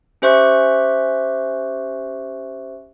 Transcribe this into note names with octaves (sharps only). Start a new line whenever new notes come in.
C#4 G4 C5 E5 C#6 F#6